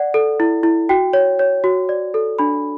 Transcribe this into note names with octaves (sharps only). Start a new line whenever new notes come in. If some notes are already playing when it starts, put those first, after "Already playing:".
Already playing: D5 F#5
A4
E4
E4
F#4 G5
C#5
C#5
F#4
D5
A4
D4 B5